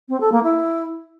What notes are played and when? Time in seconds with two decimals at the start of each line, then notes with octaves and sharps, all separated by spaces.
0.09 C4
0.20 A4
0.32 A#3
0.43 E4